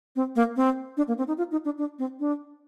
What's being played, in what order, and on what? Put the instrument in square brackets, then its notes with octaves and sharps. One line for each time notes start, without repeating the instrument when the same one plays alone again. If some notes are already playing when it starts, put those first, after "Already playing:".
[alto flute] C4
A#3
C4
D4
A#3
C4
D#4
F4
D#4
D4
D4
C4
D4